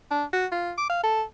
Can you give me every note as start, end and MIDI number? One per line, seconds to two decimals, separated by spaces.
0.11 0.24 62
0.33 0.46 66
0.52 0.72 65
0.78 0.85 86
0.90 0.99 77
1.03 1.22 69